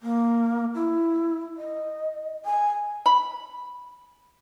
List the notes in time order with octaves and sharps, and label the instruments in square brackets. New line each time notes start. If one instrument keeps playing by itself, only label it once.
[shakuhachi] A#3
E4
D#5
G#5
[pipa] B5